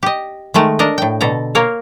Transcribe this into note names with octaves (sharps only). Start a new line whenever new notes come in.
G4 D#5
D#3 G#3 A3 A#4
D4 A#4 D#5
A2 G5
B2 D3 A4 A#5
A#3 A#4 C#5 F5